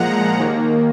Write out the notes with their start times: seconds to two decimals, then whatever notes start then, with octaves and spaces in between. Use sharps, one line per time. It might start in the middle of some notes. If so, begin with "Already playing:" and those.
Already playing: A#2 F3 G#3 F#5 A#5
0.38 D#2 D#3 A#3